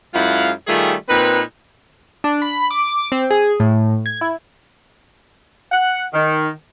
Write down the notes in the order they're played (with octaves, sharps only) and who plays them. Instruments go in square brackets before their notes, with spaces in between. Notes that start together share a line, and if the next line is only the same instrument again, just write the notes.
[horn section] F#2 G#3 E4 F4 F5 F#5
D#3 G3 A3 F4 G#4
A#2 C4 D#4 B4
[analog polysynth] D4
B5
D6
C4
G#4
A2
G#6
E4
[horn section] F#5
D#3